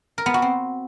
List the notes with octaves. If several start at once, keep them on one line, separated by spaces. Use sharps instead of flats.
A#4
B3
F#4
C4